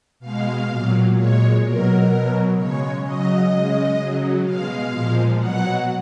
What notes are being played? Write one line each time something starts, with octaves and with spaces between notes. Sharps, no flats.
B2 G#3 F5
A#2 F#3
A#2 G#3 C#5
B2 F#3 A#4
B2 F#3
C#3 G#3 C#5
C#3 F#3 D#5
C#3 G#3
C#3 F#3
B2 G#3 F5
A#2 F3 G#3
B2 F#3 F#5